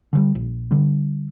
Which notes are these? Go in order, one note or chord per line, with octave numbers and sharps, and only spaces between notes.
D3 F3 G3
A#1
D3 G3